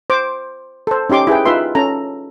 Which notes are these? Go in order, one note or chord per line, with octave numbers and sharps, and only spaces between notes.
C5 D6
A4 C5
C#4 D#4 G4 C6 D6
E4 G#4 B4 G5
D#4 F4 B4 E5 C6
C#4 A4 A#5